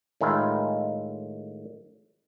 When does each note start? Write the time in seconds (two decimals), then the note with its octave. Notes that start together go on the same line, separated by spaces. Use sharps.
0.21 A2 D#3 G#3 E4 F4